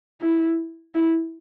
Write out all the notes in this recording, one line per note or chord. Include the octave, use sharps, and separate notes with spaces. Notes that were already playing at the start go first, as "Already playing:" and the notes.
E4
E4